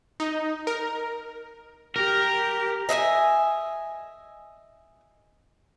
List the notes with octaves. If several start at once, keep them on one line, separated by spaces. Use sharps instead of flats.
D#4
A#4
G4 A#4
D#5 E5 F#5 G#5